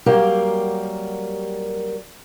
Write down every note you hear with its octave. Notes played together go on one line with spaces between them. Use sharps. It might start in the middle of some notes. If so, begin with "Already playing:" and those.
F#3 G3 A#3 G4 A#4 F5